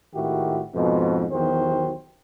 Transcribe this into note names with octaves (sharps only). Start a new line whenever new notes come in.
G#1 A2 D#3 E4 F#4 G4
F2 G#2 B2
B1 E2 D#3 F#4 G4 C5